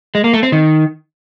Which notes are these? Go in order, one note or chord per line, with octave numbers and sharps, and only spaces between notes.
G#3
A#3
A3
C4
D#3